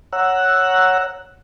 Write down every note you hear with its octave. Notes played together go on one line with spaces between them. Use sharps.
C#5 F#5 A#5 E6 F#6